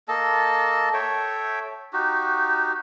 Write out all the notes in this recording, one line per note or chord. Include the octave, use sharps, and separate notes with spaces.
A#3 A4 D#5 A5
A4 C#5 E5 G5
D#4 F#4 G4